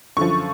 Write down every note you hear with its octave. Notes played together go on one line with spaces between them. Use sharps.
F#2 D3 F3 C#6